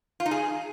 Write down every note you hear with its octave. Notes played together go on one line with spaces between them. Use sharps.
F4
D#4
G#4